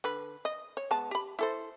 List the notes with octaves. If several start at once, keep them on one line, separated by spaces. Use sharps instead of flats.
D3 B4
D#5
C#5
G#3 B3 A5
G4 B5
E4 A4 C5